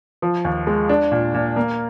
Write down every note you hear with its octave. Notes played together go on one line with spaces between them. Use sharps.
F3
D#2
G#3
D4
A#2
A#2
A#3